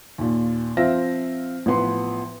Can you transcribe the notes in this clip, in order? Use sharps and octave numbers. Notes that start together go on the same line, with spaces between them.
D#2 A#2
F3 C4 F4 E5 A#6
A1 F3 B3 C6